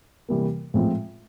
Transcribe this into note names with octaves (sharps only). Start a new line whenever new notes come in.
C3 E3 G3 A#3
A2 F3 G#3 C4 F4